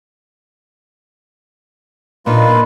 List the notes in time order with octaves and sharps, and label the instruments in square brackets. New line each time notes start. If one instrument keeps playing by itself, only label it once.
[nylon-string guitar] A#2 D4 D#4 [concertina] A#3 F4 B4